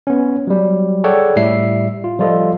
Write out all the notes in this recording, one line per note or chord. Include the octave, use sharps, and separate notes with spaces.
B3 C#4
F#3 G3
G#4 A4 C#5 D5 F#5 G5
A2 G3 E5 C7
F4
F3 G3 F4 A4 D#5